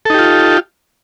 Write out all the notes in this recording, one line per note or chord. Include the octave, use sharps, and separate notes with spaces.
D#4 F4 G4 A4